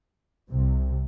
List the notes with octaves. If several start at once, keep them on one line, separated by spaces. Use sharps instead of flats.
C2 C3